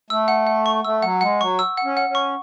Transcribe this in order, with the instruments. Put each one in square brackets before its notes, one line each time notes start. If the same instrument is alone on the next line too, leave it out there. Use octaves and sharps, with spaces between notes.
[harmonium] A3 [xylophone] E6
[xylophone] F#5
F#5
C#6
[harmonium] A3 [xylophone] E6
[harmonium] F#3 [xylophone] F#5
[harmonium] G#3 [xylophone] F#5
[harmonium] F#3 [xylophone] C#6
[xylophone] E6
F#5
[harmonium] C#4
[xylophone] F#5
[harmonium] C#4
[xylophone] C#6